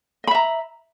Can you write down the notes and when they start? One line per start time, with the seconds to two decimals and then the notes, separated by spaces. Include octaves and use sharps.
0.24 D#5
0.27 B5
0.31 E5
0.35 A#5